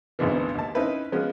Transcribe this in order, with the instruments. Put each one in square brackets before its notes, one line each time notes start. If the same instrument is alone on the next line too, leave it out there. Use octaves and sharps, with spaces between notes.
[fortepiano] G#1 D2 G#2 B2 E3
D#2 A5
C4 C#4 D#4 E4 B4 C5
F3 G#3 B3 C#4 F#4